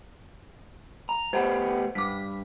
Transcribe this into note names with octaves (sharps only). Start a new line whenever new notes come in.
A#5
A3 B3 G4 C5 F#5
G2 D6 B6